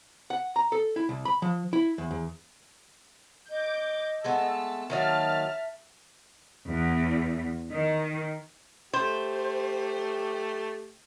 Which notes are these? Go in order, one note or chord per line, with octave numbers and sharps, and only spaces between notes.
F#5
A#5
A4
E4
C2
B5
F3
E4
E2
E2
D#5 D6 G6
G#3 A3 B3 A5 E6
D#3 F#3 A#3 E5 A5 F6 A6
E2
D#3
A3 G4 C5